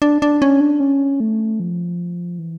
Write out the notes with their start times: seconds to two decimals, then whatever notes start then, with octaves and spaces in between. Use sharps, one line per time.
0.02 D4
0.22 D4
0.42 C#4
0.60 D4
0.80 C#4
1.20 A3
1.60 F3
2.39 E3